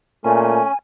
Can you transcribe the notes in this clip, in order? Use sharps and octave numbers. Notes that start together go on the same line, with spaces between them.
A#2 A3 C#4 G#5